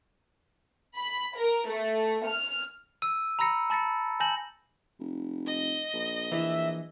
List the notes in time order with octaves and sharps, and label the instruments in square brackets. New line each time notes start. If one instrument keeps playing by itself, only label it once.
[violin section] B5
A#4
A3
F6
[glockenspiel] E6 D#7
A#5 B5 E6 A#6 C#7
A5 B5 A6 A#6 C#7
G#5 A5 G6 A#6 F#7
[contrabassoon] F1
[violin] D#5
[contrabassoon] A#1
[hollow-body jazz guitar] E3 [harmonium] E5